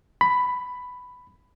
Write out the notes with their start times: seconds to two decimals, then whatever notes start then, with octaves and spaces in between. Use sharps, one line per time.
0.21 B5